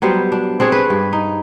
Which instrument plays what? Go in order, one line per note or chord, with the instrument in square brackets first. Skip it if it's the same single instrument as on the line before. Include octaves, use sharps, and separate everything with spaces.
[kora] F#3 G3 B3 C5
D4
C4 D4 G#4 C#5
B4
G2
D#4